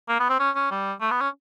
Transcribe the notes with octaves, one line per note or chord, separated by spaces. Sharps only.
A#3
B3
C4
C#4
C#4
G3
A3
B3
C#4